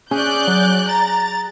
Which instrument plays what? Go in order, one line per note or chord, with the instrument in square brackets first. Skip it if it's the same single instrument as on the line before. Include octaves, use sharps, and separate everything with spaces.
[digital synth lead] C#4 [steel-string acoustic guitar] G#4 [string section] D5 F#6 G6
[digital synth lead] F#3
[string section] A#5 [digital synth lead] A6